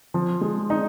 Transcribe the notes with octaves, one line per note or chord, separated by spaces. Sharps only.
F3
G#3
D#4